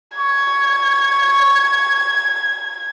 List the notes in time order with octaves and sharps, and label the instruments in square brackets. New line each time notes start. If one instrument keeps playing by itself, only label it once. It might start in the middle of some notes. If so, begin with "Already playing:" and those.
[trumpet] C#6 [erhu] G#6